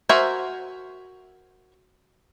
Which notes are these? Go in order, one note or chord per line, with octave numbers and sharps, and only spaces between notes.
F#4 A#4 C5 E5 G#5